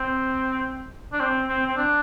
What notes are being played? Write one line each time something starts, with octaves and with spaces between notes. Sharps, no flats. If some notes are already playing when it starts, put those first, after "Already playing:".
Already playing: C4
D4
C4
C4
C4
D4